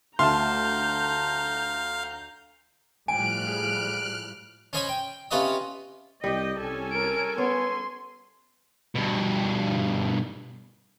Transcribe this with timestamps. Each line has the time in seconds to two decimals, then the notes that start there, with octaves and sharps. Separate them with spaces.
0.19 D2 A3 F5 A5 A#5 C6 F6 G6
3.08 A2 F3 G3 G5 G#5 F6 F#6 D7
3.47 G#4
4.73 C#4 C5 C#5 D#5 G#5 B5
4.88 G5
5.31 C3 C#4 F4 B4 D#5 D#6
6.24 C2 G3 G4 D#5 G5
6.60 C2 C#4 A4 G#5
6.92 A#4 D7
7.38 B3 C#5 C6
8.95 G2 B2